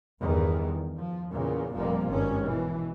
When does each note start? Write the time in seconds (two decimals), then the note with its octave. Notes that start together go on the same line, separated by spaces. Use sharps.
0.22 E2 G2 D#3
0.97 F3
1.33 E2 A#2 C#3 A#3
1.75 F1 F2 A#2 F3 G3 A#3
2.08 G#1 G2 G#3 C#4
2.43 B2 E3